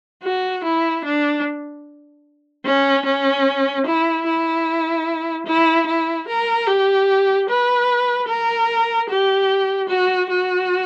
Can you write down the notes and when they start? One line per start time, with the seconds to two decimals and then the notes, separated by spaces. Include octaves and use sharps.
0.23 F#4
0.64 E4
1.05 D4
2.65 C#4
3.05 C#4
3.86 E4
4.26 E4
5.46 E4
5.86 E4
6.28 A#4
6.67 G4
7.49 B4
8.28 A#4
9.09 G4
9.89 F#4
10.30 F#4